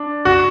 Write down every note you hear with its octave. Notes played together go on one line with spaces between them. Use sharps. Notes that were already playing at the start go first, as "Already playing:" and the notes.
Already playing: D4
F#4